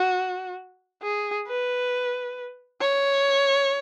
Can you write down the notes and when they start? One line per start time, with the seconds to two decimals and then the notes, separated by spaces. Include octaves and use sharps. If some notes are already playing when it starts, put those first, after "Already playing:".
Already playing: F#4
1.03 G#4
1.47 B4
2.81 C#5